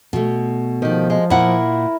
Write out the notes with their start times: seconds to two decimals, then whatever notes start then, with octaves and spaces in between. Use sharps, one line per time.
0.13 B2 A3
0.82 D#3 F3 G4
1.10 G#3
1.30 A#2 E4 A#4 F#5